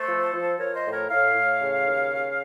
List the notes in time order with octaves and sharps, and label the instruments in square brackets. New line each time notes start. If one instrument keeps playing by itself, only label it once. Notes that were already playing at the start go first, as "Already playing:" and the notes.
Already playing: [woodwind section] A3 A4 C5
F3
F3
F3 A#4 C#5
C5 D#5
A2
A#4 C#5
A2 C#5 F5
A2
C#3
D#2
C#3